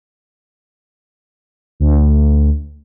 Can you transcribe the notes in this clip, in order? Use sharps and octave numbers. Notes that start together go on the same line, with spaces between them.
D2